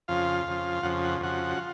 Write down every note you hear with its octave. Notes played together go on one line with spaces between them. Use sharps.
F2 C#3 F3 F4 F5
F2 C#3 F3
F2 C#3 F3 F#5
F#5
F2 C#3 F3 F#4 F#5
F4